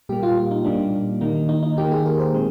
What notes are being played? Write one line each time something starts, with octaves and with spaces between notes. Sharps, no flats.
A#2 G3 A#3 G4
F4
F4
D#4
A#2 G3 A#3 D4
D#3 A#3 D#4
D#4
D#4
D#3 A#3 G4
G#4
A#4
C5
A#2 G#3 C4